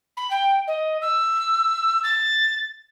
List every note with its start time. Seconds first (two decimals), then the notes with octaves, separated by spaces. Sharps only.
0.17 B5
0.30 G5
0.67 D#5
1.01 E6
2.04 A6